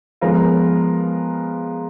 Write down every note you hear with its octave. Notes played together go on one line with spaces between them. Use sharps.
F3 G#3 B3 F4 A#4